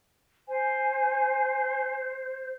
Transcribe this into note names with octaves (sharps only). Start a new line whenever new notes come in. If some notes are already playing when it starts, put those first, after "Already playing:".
C5 G#5